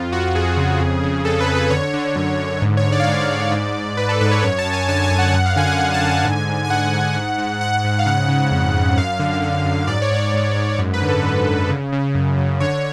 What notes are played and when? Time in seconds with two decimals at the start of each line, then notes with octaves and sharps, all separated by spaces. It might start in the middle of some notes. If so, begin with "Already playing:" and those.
Already playing: F2 F4
0.12 F2 F#4
0.35 F2 G#4
0.57 C#3
0.80 F2
1.03 C#3
1.25 F2 A4
1.40 B4
1.48 F2
1.55 B4
1.70 D3 C#5
1.94 D3
2.16 F#2
2.40 D3
2.62 G#2
2.77 C#5
2.85 G#2
2.92 D5
3.00 F5
3.07 G#2 D5
3.30 G#2
3.52 G#2
3.75 G#2
3.97 G#2 B4
4.09 A4
4.21 G#2 B4
4.31 C#5
4.43 F#2 C#5
4.59 A5
4.66 F#2
4.73 G#5
4.89 D3 A5
5.04 G#5
5.11 F#2
5.18 F#5
5.33 F#2 F#5
5.46 F5
5.56 D3 G#5
5.68 F#5
5.79 D3 G#5
5.94 A5
6.02 D3
6.10 G#5
6.24 G#2
6.48 G#2
6.65 G#5
6.70 G#2 F#5
6.93 G#2
7.15 G#2
7.38 G#2
7.61 G#2 F#5
7.84 G#2
7.99 F5
8.06 C#3 F#5
8.29 C#3
8.51 F2
8.75 F2
8.97 F#2 F5
9.20 D3
9.42 D3
9.66 F#2
9.87 G#2 D5
10.02 C#5
10.11 G#2 D5
10.34 G#2
10.56 G#2
10.79 F#2
10.94 B4
11.02 D3
11.09 A4
11.24 D3
11.47 D3
11.70 C#3
11.92 C#3
12.15 F#2
12.38 F#2
12.60 D3 C#5